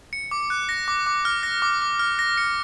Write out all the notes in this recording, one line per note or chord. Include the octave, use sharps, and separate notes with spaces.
C#7
D6
F#6
A#6
D6
D6
F6
A#6
D6
D6
F6
A#6
C#7